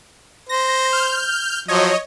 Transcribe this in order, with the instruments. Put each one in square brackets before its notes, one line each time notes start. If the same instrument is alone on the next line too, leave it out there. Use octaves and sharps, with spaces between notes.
[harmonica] C5 [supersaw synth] A#6
[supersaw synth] F6 G6
[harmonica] F3 F#3 [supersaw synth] C#5 D#5